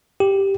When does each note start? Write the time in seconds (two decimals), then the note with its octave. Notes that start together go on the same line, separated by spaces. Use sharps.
0.20 G4